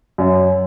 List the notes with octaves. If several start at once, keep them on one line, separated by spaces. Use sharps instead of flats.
F#2